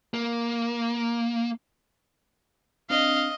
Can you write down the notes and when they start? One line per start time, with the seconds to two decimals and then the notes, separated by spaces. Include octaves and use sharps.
0.14 A#3
2.90 C4 D4 D#5 F5